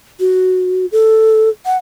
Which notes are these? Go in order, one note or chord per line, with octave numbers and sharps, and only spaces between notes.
F#4
A4
F#5